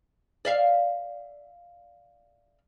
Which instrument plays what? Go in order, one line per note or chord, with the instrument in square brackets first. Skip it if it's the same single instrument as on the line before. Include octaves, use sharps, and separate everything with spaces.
[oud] D5 E5 F5